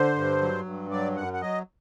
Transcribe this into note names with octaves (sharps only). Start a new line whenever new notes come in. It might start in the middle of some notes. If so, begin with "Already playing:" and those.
Already playing: D3 C5
G2
F#3
G2
F#3 D5
F#2 F#5
F#5
F#3 D#5